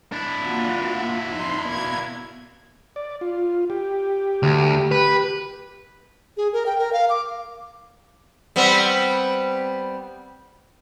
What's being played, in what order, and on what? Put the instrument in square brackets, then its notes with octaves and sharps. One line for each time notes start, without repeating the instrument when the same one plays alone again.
[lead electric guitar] D4 E4
[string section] A#3 F4 F#4
F2 D#4 C6
B2 A#3 G#6
[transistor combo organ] D5
F4
G4
[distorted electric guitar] D2
B4
[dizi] G#4
A#4
G5
A#4
F5
D6
[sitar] G3 B3 C4